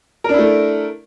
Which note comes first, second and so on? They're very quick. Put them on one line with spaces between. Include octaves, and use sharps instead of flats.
A#4 D4 E4 A3